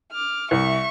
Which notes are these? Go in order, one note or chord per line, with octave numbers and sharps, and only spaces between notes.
D6 F6
C2 E5 C#6